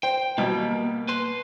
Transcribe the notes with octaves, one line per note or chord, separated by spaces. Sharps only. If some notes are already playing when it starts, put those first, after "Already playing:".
C5 G5
B2 G3 A#3
B4 C6